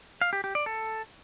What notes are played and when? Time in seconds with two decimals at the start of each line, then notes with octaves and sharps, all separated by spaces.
0.21 F5
0.33 G4
0.44 G4
0.55 D5
0.66 A4